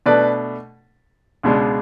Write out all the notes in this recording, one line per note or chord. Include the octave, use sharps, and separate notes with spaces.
B2 A3 D4 B4 D5
C#2 B2 G#3 D4